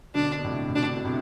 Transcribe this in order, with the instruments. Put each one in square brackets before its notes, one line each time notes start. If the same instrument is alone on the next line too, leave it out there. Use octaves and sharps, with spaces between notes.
[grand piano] B2 D3 [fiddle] D4
[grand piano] B2
A2 C3
A2
[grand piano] B2 [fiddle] D4
[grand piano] B2
A2 C3